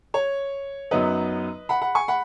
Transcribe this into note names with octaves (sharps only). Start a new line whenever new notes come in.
C#5
F#2 F#3 B3 D#4 B4 D#5
F#5 B5
F#5 B5
G#5 C#6
F#5 B5